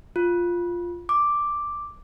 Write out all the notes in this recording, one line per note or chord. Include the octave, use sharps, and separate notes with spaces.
F4
D6